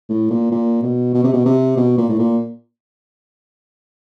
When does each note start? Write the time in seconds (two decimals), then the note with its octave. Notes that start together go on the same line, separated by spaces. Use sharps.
0.09 A2
0.30 A#2
0.52 A#2
0.83 B2
1.14 B2
1.24 C3
1.33 B2
1.45 C3
1.77 B2
1.98 A#2
2.09 A2
2.19 A#2